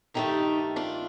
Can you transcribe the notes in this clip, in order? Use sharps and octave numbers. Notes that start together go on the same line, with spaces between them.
G2 D#3 A3 D#4 G4
D4 F4